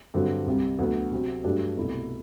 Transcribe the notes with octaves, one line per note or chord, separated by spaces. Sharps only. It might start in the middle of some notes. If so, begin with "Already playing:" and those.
G2 D3 F#3 C4 G4
C2 C3 G3
D2 D3 F#3 B3
C3 F#3 C4
G2 F#3 A3 D4 G4
C2 B2 A3 E4